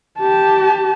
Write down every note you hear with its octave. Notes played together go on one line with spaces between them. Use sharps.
G4 A5